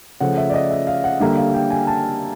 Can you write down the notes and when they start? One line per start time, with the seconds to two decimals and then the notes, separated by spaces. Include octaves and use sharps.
0.21 C#3 F3 A3 F#5
0.38 E5
0.50 D5
0.54 D#5
0.71 E5
0.87 F5
1.04 F#5
1.20 D3 G3 A#3 E5
1.37 F5
1.54 G5
1.70 G#5
1.87 A5